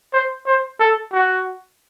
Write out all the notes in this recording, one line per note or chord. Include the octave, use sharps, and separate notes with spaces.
C5
C5
A4
F#4